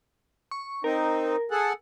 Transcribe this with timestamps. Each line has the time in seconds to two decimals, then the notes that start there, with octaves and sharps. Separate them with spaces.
0.51 C#6
0.84 C4 D#4 A#4
1.51 G#4 A4 F#5